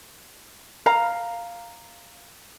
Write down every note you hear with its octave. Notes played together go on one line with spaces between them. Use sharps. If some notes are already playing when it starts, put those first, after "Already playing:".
F5 A#5